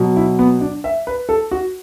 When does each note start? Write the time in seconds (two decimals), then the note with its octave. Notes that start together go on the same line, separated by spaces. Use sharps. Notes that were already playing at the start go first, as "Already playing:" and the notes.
Already playing: B2 F#3
0.16 E4
0.39 B3
0.61 D4
0.84 E5
1.07 B4
1.29 A4
1.51 F#4